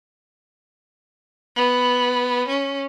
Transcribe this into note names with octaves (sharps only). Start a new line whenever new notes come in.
B3
C#4